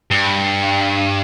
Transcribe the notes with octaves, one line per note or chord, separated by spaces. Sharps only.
G2